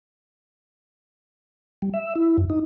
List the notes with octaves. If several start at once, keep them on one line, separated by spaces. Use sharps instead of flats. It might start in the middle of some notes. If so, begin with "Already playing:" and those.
G3
E5
E4
F#2
D#4